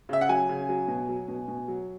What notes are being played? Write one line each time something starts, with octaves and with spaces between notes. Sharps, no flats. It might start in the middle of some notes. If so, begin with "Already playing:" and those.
C#3 E5
F#5
F#3 G#5
C#3
F#3
B2
F#3
B2
B2
F#3